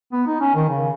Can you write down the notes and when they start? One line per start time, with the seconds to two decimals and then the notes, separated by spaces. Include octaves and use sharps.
0.13 B3
0.27 D#4
0.41 C#4
0.55 D#3
0.69 C#3